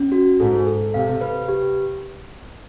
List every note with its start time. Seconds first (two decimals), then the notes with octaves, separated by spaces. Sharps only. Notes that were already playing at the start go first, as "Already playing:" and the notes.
Already playing: C#4
0.12 F#4
0.39 G#2 A4
0.67 A4
0.94 C3 F5
1.21 B4
1.48 G4